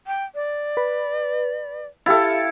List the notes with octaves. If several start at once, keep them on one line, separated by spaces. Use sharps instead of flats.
G5
D5
B4
E4 G4 A4 F5 A6